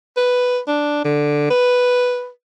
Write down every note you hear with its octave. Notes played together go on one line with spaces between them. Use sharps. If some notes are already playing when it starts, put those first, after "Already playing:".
B4
D4
D3
B4